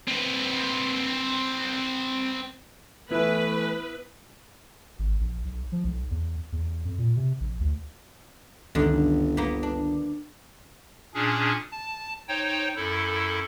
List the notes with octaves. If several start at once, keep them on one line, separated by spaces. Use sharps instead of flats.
C4 B4
E3 A3 B3 E4 B4 E5
G#1
A#1
B1
F3
B1
E2
E2
F2
A#2
C3
A#1
D2
G1 C#2 F#2 D3 D#3
G1
A#3 B3 G4
D4
A#2 C#4 D4 G#4
A5
D#4 C5 C#5 G5
F#2 E4 A4